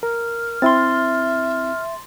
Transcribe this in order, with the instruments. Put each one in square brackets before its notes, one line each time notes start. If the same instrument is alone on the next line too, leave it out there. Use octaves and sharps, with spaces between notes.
[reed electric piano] A#4 [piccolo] F6
[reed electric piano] C4 E4 [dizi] E5 [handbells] C6 A6